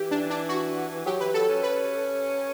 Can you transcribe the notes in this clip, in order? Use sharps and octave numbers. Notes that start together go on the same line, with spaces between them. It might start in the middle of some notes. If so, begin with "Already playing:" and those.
Already playing: E3 G4
D4
D4
F#4
F#3 G4
E3 B4
F#3 A4
C#4
B4